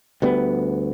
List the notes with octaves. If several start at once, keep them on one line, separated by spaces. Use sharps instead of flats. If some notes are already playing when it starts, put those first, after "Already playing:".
D2 G3 B3